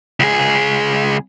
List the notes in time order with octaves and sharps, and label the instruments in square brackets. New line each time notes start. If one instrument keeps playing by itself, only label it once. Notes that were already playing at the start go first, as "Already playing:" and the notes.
[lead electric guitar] C#2 G#4